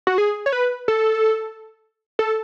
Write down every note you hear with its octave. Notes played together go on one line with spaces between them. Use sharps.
F#4
G#4
C#5
B4
A4
A4